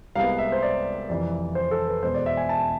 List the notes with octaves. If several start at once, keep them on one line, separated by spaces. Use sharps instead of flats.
C2 C3 G#3 B3 F5
E5
C5
D5
F2 C3 E3 D5
C5
A4
B4
E2 B2 G#3 B3 C5
D5
E5
G#5
A5